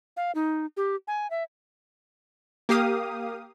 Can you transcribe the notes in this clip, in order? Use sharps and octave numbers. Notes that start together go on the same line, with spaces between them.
F5
D#4
G4
G#5
E5
A#3 G4 F5 D#6